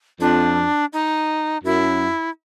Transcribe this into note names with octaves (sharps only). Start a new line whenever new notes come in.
F2 D4
D#4
F#2 E4